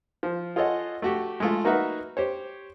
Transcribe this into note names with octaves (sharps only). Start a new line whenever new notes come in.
F3
F4 G#4 A4 C#5 D#5 F#5
A3 F#4 G4
G#3 A3 F4
A#3 D#4 F#4 B4 E5 F#5
G4 C5 C#5